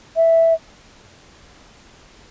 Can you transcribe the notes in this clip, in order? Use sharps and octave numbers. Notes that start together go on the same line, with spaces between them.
E5